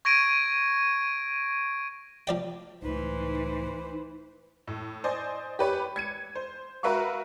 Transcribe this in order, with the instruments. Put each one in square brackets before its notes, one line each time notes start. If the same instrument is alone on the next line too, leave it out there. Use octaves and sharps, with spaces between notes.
[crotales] C#6 G#6 A#6 D7 D#7
[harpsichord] F3 D5 G5
[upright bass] C#2 A2 [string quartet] E3 B4 C5 [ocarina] D#4
[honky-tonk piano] A2
C5 D5 D#5 G#5
G4 B4 C#5
G#6 C#7 D#7
C5
F#4 A#4 B4 E5 F5 C#6